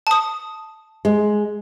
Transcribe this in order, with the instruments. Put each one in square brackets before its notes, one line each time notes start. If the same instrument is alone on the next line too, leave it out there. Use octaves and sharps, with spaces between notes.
[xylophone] A5 D#6
[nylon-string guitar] G#3